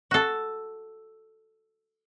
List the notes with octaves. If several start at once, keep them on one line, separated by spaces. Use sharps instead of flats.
F#4 A4